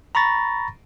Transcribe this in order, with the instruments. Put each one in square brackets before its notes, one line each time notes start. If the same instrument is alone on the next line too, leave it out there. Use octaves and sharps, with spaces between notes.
[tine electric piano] A#5 B5 C#6 A6 A#6